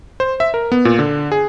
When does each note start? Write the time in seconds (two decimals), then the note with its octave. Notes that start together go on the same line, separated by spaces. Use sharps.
0.20 C5
0.40 E5
0.54 A#4
0.72 B3
0.85 A#2
0.99 D3
1.32 G#4